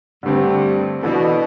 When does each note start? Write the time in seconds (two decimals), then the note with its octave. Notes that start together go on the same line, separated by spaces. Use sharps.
0.23 G2 D3 A3 C4
1.03 B2 E3 B3 D4 A4